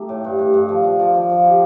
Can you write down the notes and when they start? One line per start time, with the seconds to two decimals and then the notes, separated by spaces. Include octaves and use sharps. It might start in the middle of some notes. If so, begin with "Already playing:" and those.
Already playing: A3 D#4 G4
0.09 A2
0.24 G2
0.39 G2
0.54 G2
0.69 F3
0.84 F3
0.99 F3
1.14 F3
1.29 F3
1.44 G4